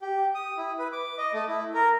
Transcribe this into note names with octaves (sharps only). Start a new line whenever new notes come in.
G4
D#6
E4
B4
D6
D#5
A3
E4
A#4